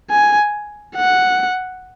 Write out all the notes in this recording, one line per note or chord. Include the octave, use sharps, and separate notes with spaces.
G#5
F#5